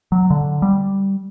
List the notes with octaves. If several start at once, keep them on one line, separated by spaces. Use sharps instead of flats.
F#3
D3
G3